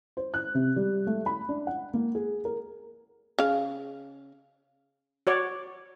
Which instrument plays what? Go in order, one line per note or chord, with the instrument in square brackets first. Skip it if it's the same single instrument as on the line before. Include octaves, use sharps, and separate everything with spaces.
[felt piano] C5
F#6
C3
G3
A3
B5
D4
F#5
A#3
G#4
A#4
[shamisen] C#3 F5
[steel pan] F#4 C#5 D5